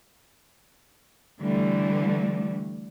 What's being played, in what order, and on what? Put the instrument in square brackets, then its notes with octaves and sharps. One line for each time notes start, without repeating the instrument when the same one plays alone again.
[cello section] D3 E3 G3 A3